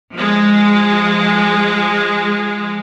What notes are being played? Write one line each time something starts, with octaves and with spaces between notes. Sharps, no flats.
F3 G#3